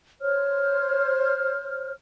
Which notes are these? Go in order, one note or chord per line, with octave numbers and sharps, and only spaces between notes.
C5 C#5 F6